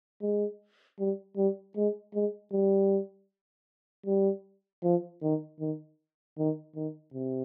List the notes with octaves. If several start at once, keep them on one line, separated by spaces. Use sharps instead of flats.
G#3
G3
G3
G#3
G#3
G3
G3
F3
D#3
D#3
D#3
D#3
C3